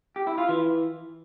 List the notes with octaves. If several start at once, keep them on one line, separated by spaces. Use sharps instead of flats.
G4
E4
F4
E3